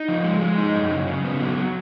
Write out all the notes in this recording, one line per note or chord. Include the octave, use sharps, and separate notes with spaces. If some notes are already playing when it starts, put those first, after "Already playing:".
Already playing: D#4
F3
G#3
G#3
D#4
F#2
C#3
C#3
B3
F#3
F#3